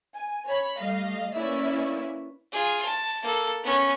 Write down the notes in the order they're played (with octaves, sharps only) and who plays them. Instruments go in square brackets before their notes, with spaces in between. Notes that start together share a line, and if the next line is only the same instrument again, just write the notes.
[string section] G#5
C#5 B5
G3 A3 D#5 F5
A#3 C#4 E4 B4 D5 E5
[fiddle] F4 G#4
A5
A#3 A4
B3 C#4